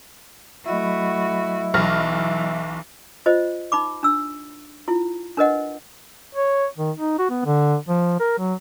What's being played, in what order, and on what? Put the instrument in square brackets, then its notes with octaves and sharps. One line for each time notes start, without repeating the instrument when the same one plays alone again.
[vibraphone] F#3 D#5 B5 [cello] A3 F#4 [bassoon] E4
[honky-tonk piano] B1 F6 A#6 [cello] E3
[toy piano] F4 C5 D#5
D#4 B5 D6
D4 E6
E4 F4
D4 A#4 B4 D#5 F#5
[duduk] C#5
D#3
D#4
F#4
B3
D3
F3
A#4
F#3